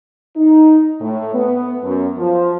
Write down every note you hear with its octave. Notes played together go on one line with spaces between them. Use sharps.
D#4
A2
B3
F#2
F3